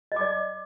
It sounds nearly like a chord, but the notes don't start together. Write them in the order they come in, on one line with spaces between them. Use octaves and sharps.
D#5 D6 D5